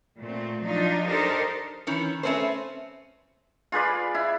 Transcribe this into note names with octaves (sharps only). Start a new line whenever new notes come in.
A#2 A3 C4
F3 F#3 D4 D#4 F4
D4 D#4 G4 A4 A#4 C5
D#3 E3 C#4
A3 C4 C#4 B4 C5
F4 G#4 B4 D5
E4